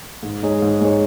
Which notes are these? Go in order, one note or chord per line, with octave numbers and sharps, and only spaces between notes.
G#2
G#3 D#4 G#4 C#5
G#2
G#3 D#4 G#4 C#5